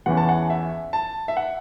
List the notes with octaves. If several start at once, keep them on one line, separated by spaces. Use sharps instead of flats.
E2 E3 C#4 F#5
A5
F#5
E5
A5
E5
F#5